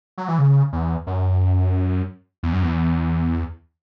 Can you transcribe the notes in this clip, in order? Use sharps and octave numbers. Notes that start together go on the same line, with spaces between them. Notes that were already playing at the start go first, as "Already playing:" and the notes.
F#3
E3
C#3
E2
F#2
E2
F#2
E2